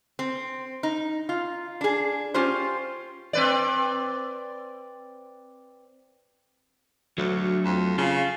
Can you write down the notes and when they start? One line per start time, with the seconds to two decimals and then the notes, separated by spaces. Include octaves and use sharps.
0.19 C4
0.83 D#4
1.29 F4
1.81 D4 G#4
2.34 C#4 F4 G4 C5
3.33 C4 B4 D5
7.18 D2 F#3 A3
7.65 F2
7.98 C#3 F4